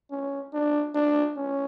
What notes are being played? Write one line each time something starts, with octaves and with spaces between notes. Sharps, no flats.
C#4
D4
D4
C#4